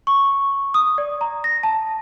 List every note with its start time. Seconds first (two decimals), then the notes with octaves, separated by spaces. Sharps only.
0.07 C#6
0.74 D#6
0.98 D5
1.21 A#5
1.44 A#6
1.63 A5